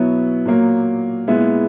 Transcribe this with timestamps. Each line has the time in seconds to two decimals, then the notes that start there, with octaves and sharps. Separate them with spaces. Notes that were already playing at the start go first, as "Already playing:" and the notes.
Already playing: B2 F#3 B3 E4
0.45 A#2 F#3 A#3
1.28 A#2 G#3 B3 E4